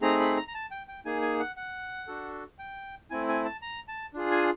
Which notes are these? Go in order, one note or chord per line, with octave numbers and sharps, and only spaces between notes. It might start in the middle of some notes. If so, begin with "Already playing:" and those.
A3 C4 D#4 G#4 A#5
B5
A#5
A#5
A5
G5
G5
A#3 D#4 G#4 G#5
G#5
F#5
F#5
D4 F#4 A4
G5
A3 C4 E4 G#5
G#5
A5
A#5
A5
D4 F4 G#4
G#5